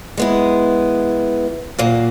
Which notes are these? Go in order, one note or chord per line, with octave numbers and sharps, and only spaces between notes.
G#3 B3 E4
A#2 F#3 A#3